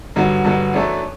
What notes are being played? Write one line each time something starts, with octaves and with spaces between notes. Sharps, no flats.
G2 D3 F#3 B3
G2 D3 F#3 B3
F#2 E3 A3 D4 A4